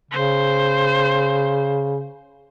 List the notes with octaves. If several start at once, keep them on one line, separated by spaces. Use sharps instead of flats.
C#3 C5